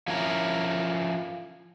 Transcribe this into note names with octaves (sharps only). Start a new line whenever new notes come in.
F3 C#4 E4 A#4